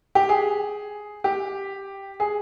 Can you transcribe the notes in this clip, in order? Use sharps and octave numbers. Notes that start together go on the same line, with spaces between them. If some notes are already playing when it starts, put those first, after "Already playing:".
G4
G#4
G4
G#4